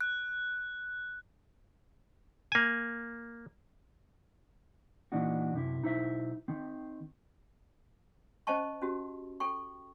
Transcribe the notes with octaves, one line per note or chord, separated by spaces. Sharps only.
F#6
A#3 G#5
A#2 D#3 E3 D4 D#4 F#4
F#2 C3 E4
B1 D#4 E4 C5 E5
D#3 C4
C#4 C5 D#5 G5 A5 C#6
C#4 F#4 G4
A4 G5 C#6